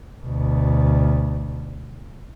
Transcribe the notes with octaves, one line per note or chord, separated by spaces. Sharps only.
D2 B2